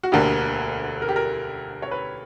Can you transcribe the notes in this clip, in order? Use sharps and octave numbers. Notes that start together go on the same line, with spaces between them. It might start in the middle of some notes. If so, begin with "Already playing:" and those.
F#4
E1 D2 D3 A#3 G4
A#4
G4
A#4
C#5
B4